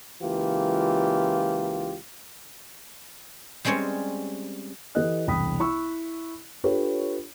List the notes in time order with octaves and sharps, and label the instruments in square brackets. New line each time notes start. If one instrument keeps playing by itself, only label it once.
[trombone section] C#2 E3 A#3 F4 G4
[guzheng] G3 G#3 C4 C#4 C#5
[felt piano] E3 G4 A4 B4 D#5 F#6
E1 C2 G5 B5 D#6 B6
E4 B5 C#6 E6
D4 F4 G4 A4 B4 C#5